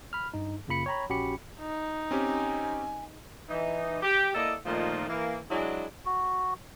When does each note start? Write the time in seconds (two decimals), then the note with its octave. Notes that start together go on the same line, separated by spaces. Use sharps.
0.13 B5 F6
0.34 G2 D#4
0.68 F#2 C#3 A#3 F4 B5 C#7
0.86 C#5 G5 A#5 B5
1.09 A#1 C#4 F#4 G4 B5 C#7
1.59 D#4
2.11 C4 C#4 G4 G#5
3.49 E3 D#4
4.02 G4
4.35 A#3 E4 A4 D5 D#5
4.65 A#2 D#3 F3 A3 A#3 D#4
5.08 E3 A#3
5.50 F#3 G#3 D4 E4 F#4 G#4
6.05 F#4